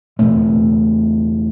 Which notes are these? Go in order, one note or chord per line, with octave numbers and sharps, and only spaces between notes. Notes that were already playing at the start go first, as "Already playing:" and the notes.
E2 B2 A3